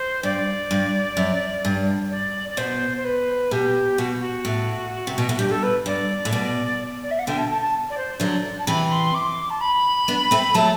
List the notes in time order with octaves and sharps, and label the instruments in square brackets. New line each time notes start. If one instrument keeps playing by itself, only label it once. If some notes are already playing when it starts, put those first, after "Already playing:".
Already playing: [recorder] C5
[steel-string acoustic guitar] G2 [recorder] D5
[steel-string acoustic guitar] G2
F#2
G2
[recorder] D5
D5
[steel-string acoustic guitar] B2 [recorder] C5
[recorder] C5
B4
[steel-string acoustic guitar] B2 [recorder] G4
[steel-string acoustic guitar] B2 [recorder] F#4
[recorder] F#4
[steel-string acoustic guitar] A2
C3
B2
A2
[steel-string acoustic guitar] G2 [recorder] G4
[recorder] A4
B4
[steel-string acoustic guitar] G2 [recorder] D5
[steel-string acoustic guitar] A2
[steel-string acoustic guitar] B2 [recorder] D5
[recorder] D5
E5
F#5
[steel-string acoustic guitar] B2 D3 [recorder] G5
[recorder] A5
A5
A5
D5
C5
[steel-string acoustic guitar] D3 F#3 [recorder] D5
[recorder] A5
[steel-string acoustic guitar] C3 E3 [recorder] B5
[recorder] C6
D6
A5
B5
[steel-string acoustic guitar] B3 D4
A3 C4
[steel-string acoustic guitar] F#3 A3 [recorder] A5